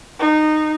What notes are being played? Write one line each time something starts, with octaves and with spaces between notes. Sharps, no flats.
D#4